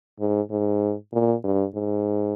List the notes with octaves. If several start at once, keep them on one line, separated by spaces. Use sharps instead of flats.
G#2
G#2
A#2
G2
G#2